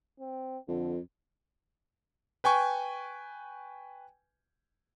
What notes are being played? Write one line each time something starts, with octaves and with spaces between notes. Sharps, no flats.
C4
F2 D3
B4 G5 G#5 C#6